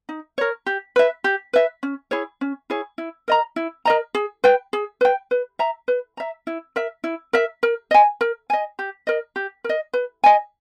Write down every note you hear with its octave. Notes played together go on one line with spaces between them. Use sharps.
D#4
A#4 C#5
G4
B4 E5
G4
B4 E5
C#4
E4 G#4 C#5
C#4
E4 G#4 C#5
E4
A#4 D#5 A#5
E4
A#4 D#5 A#5
G#4
B4 G5
G#4
B4 G5
B4
E5 A#5
B4
E5 A#5
E4
A#4 E5
E4
A#4 E5
A#4
D#5 G#5
A#4
D#5 G#5
G4
A#4 D#5
G4
A#4 D#5
B4
D#5 G#5